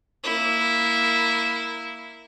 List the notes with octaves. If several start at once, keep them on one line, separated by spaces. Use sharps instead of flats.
A#3 E4